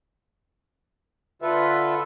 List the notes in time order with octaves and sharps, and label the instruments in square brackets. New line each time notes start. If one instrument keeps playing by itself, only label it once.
[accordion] D3 F4 A4 B4 E5